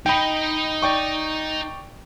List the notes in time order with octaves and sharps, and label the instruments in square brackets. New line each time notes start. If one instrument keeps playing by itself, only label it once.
[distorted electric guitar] D#4 D#5 [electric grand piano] G5 B5
[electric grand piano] D5 G5 C#6